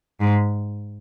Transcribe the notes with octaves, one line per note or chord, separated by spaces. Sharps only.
G#2